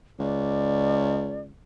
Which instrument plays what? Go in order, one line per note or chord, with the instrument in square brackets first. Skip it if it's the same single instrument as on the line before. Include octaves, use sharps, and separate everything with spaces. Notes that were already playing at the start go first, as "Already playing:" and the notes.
[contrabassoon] C#2 [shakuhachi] D5